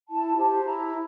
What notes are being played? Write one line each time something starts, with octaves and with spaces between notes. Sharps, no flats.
E4 A5
G4 C5 A5
E4 A#5
A#5